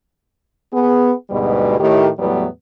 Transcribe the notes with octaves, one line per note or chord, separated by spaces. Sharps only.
B3 G#4
D2 G#2 B2 G3 G#3 B3
A2 D#3 G4
E2 A2 F#3 G3 B3